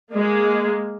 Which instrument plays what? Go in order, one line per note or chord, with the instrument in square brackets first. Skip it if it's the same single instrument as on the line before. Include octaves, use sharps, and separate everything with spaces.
[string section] G#3 A#3